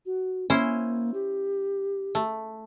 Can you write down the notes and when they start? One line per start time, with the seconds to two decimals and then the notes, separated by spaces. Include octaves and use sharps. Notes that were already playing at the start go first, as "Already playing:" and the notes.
0.06 F#4
0.50 A#3 C#4 E4 C5
1.14 G4
2.15 A3